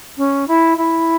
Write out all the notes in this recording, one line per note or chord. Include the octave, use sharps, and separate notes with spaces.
C#4
E4
E4